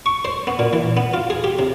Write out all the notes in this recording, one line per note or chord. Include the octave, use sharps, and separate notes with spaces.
C#6
C5
B3
A#2
E3
B3
F4
G#4
G4
C3